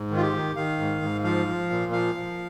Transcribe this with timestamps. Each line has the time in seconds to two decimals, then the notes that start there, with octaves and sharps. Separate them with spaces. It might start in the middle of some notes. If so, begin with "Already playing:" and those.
Already playing: G#2
0.11 D#3
0.17 F4
0.22 G4
0.33 D#3
0.55 D#3 F5
0.79 G#2
1.02 G#2
1.24 F3 F5
1.47 F3
1.70 A#2
1.92 F3 F5
2.15 F3